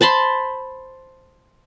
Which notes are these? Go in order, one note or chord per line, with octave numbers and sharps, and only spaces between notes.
C5 A5 B5 C6